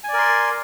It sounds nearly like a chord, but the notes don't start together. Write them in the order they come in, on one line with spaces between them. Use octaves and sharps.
G#5 D5 A#4 C6